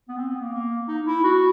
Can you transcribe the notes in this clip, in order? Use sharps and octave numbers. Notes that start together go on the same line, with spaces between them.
B3
C4
B3
A#3
A#3
D#4
E4
F#4